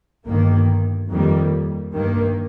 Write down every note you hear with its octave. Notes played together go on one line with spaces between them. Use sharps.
G1 G2 D#3 A#3
F2 D#3 G3 A#3
G2 D#3 A#3